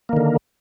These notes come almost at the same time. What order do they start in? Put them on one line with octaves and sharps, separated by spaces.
A#3 D#3 D3